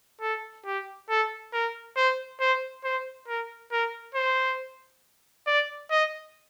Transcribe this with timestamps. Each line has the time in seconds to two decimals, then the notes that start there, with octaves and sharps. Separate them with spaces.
0.21 A4
0.66 G4
1.09 A4
1.53 A#4
1.96 C5
2.40 C5
2.84 C5
3.28 A#4
3.72 A#4
4.15 C5
5.47 D5
5.91 D#5